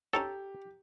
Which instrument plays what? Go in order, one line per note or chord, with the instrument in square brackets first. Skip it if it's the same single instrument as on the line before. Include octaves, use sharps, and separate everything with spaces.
[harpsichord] C#4 D#4 C#5 [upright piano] G4 [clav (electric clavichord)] A4